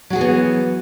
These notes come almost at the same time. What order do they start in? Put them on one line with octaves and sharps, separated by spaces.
F#3 F#4 G#4 E3 B3